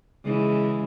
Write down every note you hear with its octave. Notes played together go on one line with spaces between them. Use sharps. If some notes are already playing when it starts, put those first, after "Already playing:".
C#3 E3 G#3